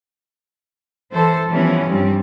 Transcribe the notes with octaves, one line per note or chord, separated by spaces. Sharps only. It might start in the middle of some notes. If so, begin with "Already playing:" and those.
E3 A4 C5
E3 F3 G3 B3 C#4
G2 G3 C4